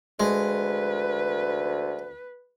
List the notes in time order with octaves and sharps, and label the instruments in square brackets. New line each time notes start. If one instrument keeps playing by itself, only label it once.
[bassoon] D2 [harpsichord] G#3 [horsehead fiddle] B4